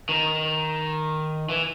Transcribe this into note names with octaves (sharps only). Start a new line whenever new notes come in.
D#3
E3